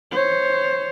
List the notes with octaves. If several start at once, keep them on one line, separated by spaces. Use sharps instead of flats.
C5 C#5